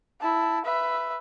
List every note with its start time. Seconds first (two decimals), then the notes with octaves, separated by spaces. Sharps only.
0.20 E4 A5
0.65 B4 E5